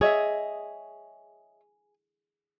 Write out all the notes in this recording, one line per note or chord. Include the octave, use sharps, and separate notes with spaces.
G#4 C#5 D#5 E5